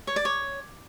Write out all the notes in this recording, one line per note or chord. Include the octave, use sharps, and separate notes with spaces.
C#5
D5
C#5